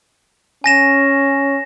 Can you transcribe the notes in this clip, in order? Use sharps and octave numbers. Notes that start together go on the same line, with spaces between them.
C#4 G#5 A#6 E7